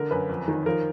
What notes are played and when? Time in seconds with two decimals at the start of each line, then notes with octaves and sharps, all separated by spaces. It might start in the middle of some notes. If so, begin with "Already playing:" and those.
Already playing: D3 A#4
0.11 F#2 B4
0.29 F2
0.48 D#3
0.66 F3 A#4